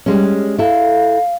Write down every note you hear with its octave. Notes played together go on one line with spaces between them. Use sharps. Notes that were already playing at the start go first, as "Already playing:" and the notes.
G3 G#3 C#4
E4 A4 F5